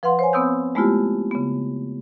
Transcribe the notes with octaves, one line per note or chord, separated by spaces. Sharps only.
F3 B4 F5 F#5 C6
C5 C#5 G#5
B3 C4 D#6 E6 G6
G#3 A3 B3 E4 F4 G4
C#3 B3